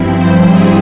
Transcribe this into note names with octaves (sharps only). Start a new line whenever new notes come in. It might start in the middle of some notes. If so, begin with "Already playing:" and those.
Already playing: G2 F3 C4 E4
C5
G#2 G3 C4 E4 G#4